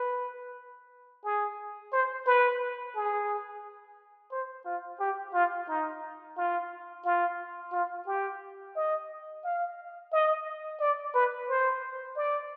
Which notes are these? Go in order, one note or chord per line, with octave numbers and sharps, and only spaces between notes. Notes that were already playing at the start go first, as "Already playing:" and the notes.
Already playing: B4
G#4
C5
B4
G#4
C5
F4
G4
F4
D#4
F4
F4
F4
G4
D#5
F5
D#5
D5
B4
C5
D5